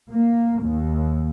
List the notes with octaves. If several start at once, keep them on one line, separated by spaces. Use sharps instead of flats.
A#3
D#2